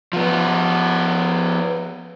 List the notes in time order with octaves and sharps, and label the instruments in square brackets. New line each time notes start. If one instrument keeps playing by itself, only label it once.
[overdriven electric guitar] F3 B3